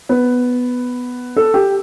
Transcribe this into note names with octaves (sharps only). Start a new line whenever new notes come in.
B3
A4
G4